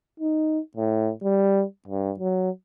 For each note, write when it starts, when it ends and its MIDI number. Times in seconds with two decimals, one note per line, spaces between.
0.20 0.59 63
0.77 1.12 45
1.24 1.64 55
1.88 2.12 43
2.20 2.50 54